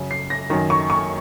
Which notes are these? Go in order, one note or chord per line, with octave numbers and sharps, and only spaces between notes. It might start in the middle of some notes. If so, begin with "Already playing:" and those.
Already playing: F#2 C#3
C7
A#6
F#2 D#3
C#6
C#6